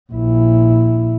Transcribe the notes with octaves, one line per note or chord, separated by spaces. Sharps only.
A#1 E4